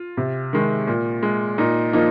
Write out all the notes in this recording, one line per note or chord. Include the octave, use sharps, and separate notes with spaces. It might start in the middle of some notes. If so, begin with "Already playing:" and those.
Already playing: F4
C3
D#3 G#3
A#2
G#3
A#2 D#4
F3 A#3 D#4